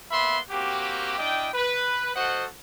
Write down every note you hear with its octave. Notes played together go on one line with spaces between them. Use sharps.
A#3 B3 E5 B5 C6
A#3 C4 F#4 G4
D4 E4 D#5 G5
B4
F#4 A4 C5 D#5 F#5